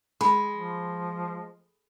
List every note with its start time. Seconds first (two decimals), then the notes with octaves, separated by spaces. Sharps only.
0.21 G#3 B5
0.54 F3